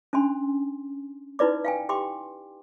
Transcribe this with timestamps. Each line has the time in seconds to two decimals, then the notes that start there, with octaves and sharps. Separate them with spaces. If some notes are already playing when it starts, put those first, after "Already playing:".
0.13 C#4 D4 G#5 C6
1.39 D#4 E4 B4 D5 D6
1.65 F5 G5 G#5
1.89 G4 G5 C6 D6